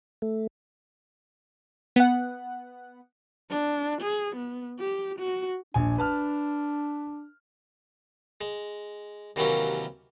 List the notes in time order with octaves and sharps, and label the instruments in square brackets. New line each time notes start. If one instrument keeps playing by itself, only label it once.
[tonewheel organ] A3
[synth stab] B3 F#5
[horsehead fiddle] D4
G#4
B3
G4
F#4
[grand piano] A#1 G#5 [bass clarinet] D4
[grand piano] B4 A5 F6
[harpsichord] G#3
D#2 C3 E3 F#3 A#3 C#4